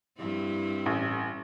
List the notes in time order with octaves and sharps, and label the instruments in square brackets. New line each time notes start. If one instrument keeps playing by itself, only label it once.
[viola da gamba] G2 C4 E4
[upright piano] A1